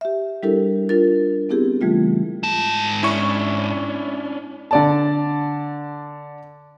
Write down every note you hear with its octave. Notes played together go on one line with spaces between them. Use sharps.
G4 E5
G3 D4 E4 G4 A4 A#4
D4 F4 A#4 A6
B3 C4 E4 G4 G#4
C#3 E3 G3 A3 F4
G#2 A5
C#4 D4 E4 C#6
D3 D5 A5